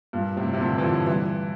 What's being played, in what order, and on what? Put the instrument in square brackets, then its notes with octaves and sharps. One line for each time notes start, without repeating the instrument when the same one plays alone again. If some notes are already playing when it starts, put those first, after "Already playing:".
[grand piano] G2 A#2
A2 C3
C3
A#2 D3
E3
D3 F3
E3 G3